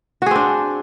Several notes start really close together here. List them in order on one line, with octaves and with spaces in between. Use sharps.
F#4 G#4 C4 D4